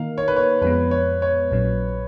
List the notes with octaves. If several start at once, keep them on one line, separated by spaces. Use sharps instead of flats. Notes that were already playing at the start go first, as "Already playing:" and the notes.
Already playing: D#3 A#3 D#4 A#4 F5
C#5
B4
C#5
F2 F3 G#3 B3 B4
C#5
C#5
A#1 A#2 F#3 C#4